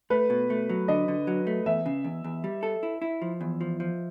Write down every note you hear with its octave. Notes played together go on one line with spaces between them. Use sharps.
A3 B4
B2
A3
F#3
D3 D#5
D3
F#3
A3
E2 E5
C#3
E2
E2
G3
A4
E4
E4
F3
E2
F3
F3